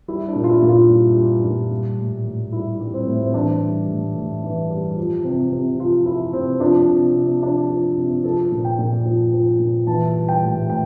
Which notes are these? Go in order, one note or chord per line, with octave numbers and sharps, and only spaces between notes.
G3 E4
D4
A#2
F4
E4
A#2
F4
G3
G3
A#2
G3
A2
A2
G3 E4
G3
C4
A2
C4
E3 D4
G3
A2
A2
E3
G3
F3
C3
C3
F3 F4
F3 E4
C3 C4
F3 D4
C3
C3
F3 D4
F3
C3
F3 A4
A#2
G5
A#2
F3
F3
A#2
E3 A5
G3
G5
A2
A2 G5